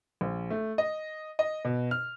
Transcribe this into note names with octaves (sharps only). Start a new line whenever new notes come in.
A#1
A3
D#5
D#5
B2
F6